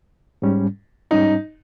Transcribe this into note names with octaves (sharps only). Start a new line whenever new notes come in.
G#2 G3 C#4
G#2 G3 C#4 D#4